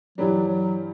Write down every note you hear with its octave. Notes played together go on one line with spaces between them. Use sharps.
G2 E3 F#3 G3 D4
F#3